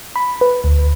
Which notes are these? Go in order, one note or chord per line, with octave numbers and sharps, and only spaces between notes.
B5
B4
D2